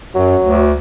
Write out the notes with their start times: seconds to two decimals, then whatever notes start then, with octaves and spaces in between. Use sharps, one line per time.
0.15 F#2 F#3
0.42 D2